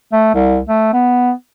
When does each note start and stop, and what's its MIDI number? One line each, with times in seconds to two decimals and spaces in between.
0.13 0.30 57
0.34 0.59 36
0.69 0.92 57
0.93 1.31 59